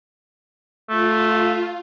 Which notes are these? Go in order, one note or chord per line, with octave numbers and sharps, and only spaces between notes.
A3 F4